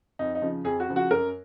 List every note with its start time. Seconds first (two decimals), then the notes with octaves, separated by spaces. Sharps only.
0.19 F2 D#4
0.35 D#4
0.42 C#3 F3
0.64 F2 G#4
0.80 F#4
0.88 C#3 F3
0.96 F#4
1.11 F#2 A#4